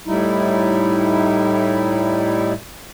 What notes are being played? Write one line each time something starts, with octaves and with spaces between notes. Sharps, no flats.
A2 G3 D#4 E4